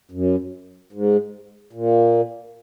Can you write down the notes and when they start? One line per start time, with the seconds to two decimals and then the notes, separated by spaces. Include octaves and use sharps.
0.12 F#2
0.93 G#2
1.73 A#2